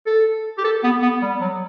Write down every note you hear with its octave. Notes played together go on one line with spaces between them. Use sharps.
A4
G4
A4
B3
B3
G3
F#3